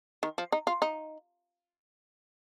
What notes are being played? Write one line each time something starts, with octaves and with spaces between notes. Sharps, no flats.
D#3
F3
D#4
F4
D#4